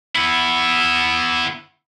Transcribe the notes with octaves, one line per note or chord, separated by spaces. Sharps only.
B3 E4